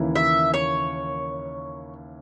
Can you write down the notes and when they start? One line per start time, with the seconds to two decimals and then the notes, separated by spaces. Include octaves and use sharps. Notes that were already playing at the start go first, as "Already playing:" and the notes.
Already playing: D#2 C#3 E3 A#3 E4
0.16 E5
0.54 C#5